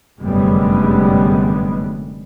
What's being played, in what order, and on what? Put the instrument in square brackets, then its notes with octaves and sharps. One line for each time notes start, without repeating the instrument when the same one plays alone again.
[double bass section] F1 F#2 D3 G3 G#3 B3